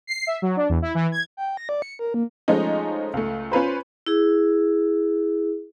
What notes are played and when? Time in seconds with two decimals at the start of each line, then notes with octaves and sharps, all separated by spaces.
0.07 C7
0.27 E5
0.42 F#3
0.57 D4
0.69 E2
0.82 E4
0.95 E3
1.12 G#6
1.37 G5
1.57 A#6
1.69 D5
1.82 C#7
1.99 A#4
2.14 A#3
2.48 F3 G#3 A3 C#4 D#4
3.14 C#2 A3
3.52 C#4 F4 B4 C5
4.07 E4 G#4